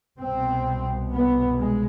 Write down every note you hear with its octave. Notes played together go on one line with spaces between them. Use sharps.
C2 B2 C4
B3
G#3